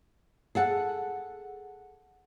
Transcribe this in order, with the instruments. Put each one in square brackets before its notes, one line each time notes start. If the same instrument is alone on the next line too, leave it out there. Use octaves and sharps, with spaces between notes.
[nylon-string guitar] G#4 A4 F#5